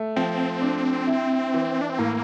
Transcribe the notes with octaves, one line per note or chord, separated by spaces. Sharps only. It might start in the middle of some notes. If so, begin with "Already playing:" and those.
Already playing: A3
F3 C4
D4
E4
E3
D4
C4
A2 A#3